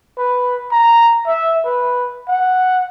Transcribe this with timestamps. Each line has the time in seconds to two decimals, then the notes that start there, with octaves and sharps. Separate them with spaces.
0.18 B4
0.71 A#5
1.27 E5
1.65 B4
2.28 F#5